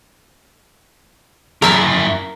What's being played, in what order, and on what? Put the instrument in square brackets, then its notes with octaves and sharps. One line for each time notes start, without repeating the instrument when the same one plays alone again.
[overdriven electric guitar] F#2 E4 [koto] A#4 E5 A5